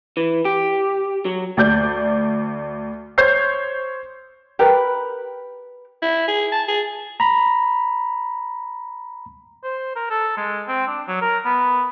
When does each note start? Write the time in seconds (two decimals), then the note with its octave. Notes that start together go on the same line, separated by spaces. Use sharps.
0.17 E3
0.45 G4
1.25 F#3
1.57 D2 D5 G6
3.18 C5 C#5 G6 C7
4.59 G4 A#4 B4
6.02 E4
6.28 G#4
6.52 A5
6.68 G#4
7.20 A#5 B5
9.64 C5
9.96 A#4
10.10 A4
10.37 G#3
10.68 C4
10.87 D4
11.08 F#3
11.21 A#4
11.45 B3